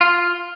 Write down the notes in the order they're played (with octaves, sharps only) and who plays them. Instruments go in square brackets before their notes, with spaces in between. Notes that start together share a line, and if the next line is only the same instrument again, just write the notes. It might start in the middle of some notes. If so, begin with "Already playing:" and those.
[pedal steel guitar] F4